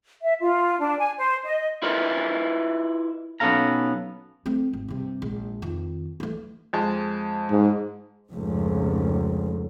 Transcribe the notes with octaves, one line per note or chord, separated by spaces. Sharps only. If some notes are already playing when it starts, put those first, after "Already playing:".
E5
F4
D4
G#5
C5
D#5
E4 F4 A#4 B4 D#5 E5
B1 B3 C#4 A4 F5 A#5
A3 C4
G#1
G2 C3
A#1 G#3
F2 D#3
E3 A3
F2 G#3 A5
G#2
F1 C#2 G#2